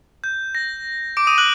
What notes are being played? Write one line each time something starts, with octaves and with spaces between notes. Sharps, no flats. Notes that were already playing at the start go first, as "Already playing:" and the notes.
G6
A#6
D6 D7
D#6 D#7
F#6 F#7